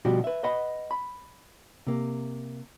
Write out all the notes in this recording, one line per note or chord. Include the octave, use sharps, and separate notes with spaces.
B2 F3 G3 F#4 G4
B4 E5
B4 D#5 F#5 B5
B5
C3 A#3